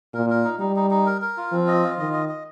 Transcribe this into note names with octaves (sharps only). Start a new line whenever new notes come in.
A#2 A#4
A#4
D#4
G3 D#4
D#4
D#4
A#4
A#4
F4
F3 C4
D#5
F4
D#3 D#5
D#5
D#5